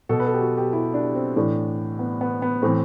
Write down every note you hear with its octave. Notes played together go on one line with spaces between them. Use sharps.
B2 A4
B4
A4
G4
F#4
G4
E4
D4
C4
A2 E3 D4
B3
B3
B3
A2 E3 C4